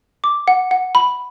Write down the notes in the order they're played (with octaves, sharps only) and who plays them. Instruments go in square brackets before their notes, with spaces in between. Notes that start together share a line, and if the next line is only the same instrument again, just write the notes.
[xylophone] D6
F#5
F#5
B5